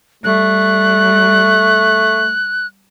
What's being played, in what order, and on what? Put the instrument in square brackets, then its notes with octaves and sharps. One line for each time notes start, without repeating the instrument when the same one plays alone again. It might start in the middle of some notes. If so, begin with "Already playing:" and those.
[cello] G3 [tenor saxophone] A3 [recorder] F#6